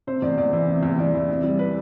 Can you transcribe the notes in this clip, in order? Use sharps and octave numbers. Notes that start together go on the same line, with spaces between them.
C3 C5
E2 D5
E2 D5
E3
C3
E2
E2 D5
E3
C3
G3
B4